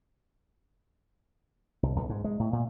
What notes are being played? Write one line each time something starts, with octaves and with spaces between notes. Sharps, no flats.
C2
B1
G#2
G#3
A2
A#2